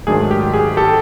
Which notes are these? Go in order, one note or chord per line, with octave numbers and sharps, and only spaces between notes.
G#2 D#3 F#3 A3 D4 G#4
G4
G#4
G4 A4